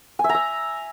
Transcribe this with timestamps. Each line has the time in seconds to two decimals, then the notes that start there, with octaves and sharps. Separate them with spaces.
0.19 G#5
0.24 E5
0.29 A#5
0.34 E5